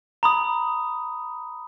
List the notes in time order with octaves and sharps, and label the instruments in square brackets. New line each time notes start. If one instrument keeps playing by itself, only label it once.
[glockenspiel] A#5 B5 D#6